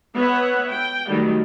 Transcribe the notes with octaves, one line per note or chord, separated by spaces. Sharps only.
B3 C#5 E5 F#5
G5
D#3 F#3 G3 A3